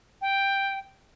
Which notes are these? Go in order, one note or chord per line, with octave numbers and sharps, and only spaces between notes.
G5